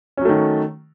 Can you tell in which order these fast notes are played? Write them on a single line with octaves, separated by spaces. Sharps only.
C#4 F#3 A3 D#3